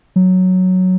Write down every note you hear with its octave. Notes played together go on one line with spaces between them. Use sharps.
F#3